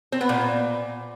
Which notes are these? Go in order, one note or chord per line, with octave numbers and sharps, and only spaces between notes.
C4
B3
A#2